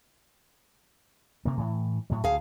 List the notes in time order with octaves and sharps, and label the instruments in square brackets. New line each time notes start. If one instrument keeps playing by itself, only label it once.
[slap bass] C3 A#3
A2 E3
A2 F#3
[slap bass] D2 [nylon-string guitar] G#4 F5